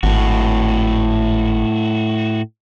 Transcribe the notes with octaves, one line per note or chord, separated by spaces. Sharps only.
G#1 A2 F#4